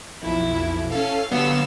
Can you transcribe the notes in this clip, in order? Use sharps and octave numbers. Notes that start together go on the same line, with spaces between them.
B1 F2 E4
C#4 A4 F5
D3 F#3 G3 B3 F5 E6